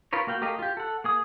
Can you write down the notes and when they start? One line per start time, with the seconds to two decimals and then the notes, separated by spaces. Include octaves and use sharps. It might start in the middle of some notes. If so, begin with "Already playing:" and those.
0.13 F4 A#4 B4 C#5
0.27 A#3 F#4 F5 G5
0.41 A3 G4 A#4 D#5 F5
0.59 F4 G4
0.77 A4 F#5
1.04 A#3 G#4 D#6